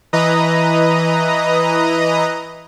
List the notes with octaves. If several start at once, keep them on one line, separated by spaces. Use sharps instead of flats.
E3 B4 D#5 A#5 D#6